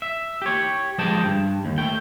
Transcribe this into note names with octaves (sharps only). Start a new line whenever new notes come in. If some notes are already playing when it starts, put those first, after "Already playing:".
E5
G4 C#5
F3 G#3 G4 D#5 G5 A5
G2
D#2
A3 G5